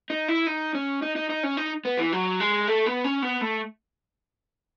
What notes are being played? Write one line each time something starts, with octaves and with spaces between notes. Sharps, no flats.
D#4
E4
D#4
C#4
D#4
D#4
D#4
C#4
D#4
B3
E3
F#3
G#3
A3
B3
C#4
B3
A3